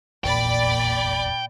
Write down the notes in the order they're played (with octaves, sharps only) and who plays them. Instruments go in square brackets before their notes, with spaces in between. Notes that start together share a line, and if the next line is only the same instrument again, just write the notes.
[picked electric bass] F1 A#1 E2 [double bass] A#2 [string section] D5 B5 [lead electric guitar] G5